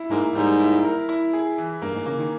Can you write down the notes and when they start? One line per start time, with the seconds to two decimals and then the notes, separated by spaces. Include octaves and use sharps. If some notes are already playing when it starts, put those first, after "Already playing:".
Already playing: E4
0.10 G#2 A#3
0.35 G#2 G3
0.59 E4
0.85 A#4
1.09 E4
1.33 G#4
1.58 E3
1.82 G2 A#3
1.94 G#2
2.06 C#3 A#3
2.19 D#3